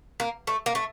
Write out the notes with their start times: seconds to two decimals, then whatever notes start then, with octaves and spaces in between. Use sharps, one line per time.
0.20 A#3
0.47 A3
0.66 A#3
0.75 A3